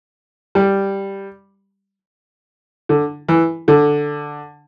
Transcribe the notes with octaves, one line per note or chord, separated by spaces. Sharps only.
G3
D3
E3
D3